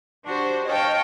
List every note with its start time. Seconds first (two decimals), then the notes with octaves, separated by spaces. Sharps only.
0.24 D4 F#4 G4 C5
0.66 C#5 D#5 F5 G5 A5